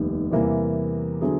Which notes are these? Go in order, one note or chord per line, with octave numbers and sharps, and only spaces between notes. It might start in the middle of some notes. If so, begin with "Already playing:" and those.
Already playing: F1 D#2 D#3 G3 B3
E2 C3 E3 G3 A#3
D3 F#3 B3 E4 G#4